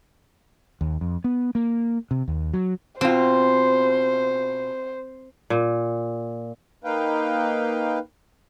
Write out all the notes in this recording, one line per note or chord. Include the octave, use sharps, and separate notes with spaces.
D#2
F2
B3
A#3
C3
D#2
F#3
B2 C4 F4 C5
A#2
A#3 D#4 B4 F5 G5